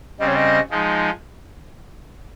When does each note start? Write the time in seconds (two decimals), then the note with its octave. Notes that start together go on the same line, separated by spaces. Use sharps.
0.19 C#3 G3 C4 D#5
0.28 C#5
0.36 D#5
0.70 F3 G#3 D#4